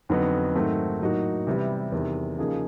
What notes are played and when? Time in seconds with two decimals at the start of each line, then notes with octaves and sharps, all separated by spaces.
0.09 F2 D3 F#3 B3 D#4
0.55 G#2 D#3 F#3 A3 C4
1.01 A2 F#3 A#3 D#4 F#4
1.47 C3 E3 G3 B3 E4
1.92 E2 C3 D#3
2.38 C#3 F3 A#3 D#4 G#4